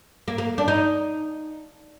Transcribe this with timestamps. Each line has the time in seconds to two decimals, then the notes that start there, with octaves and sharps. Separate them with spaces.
0.28 A#3
0.38 A#3
0.58 D4
0.68 D#4